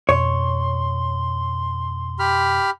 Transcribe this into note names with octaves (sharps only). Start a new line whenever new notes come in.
F2 B2 C#5 C6
G4 B5 F6